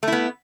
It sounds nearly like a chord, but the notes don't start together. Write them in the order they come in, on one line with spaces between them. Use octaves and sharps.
A3 E4 B3